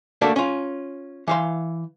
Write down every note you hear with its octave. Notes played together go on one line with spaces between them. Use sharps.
A3 A#3 D4 F#4 A4 E5
C#4 F4
E3 F5 C6